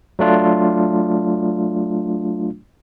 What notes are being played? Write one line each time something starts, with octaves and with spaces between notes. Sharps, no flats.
F#3 A3 D4 F4